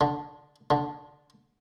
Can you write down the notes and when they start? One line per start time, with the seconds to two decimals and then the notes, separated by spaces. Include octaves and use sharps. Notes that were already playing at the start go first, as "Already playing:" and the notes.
0.01 D3
0.71 D3